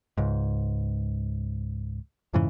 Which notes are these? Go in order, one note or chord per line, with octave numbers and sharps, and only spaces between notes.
C#2 G#2
F2 G#2 C#3 E3